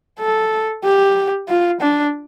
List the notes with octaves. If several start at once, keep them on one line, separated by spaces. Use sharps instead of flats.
A4
G4
F4
D4